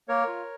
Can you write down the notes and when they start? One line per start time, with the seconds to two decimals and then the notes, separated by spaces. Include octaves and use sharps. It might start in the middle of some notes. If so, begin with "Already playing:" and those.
0.08 A#3 A#4 C#5
0.27 F4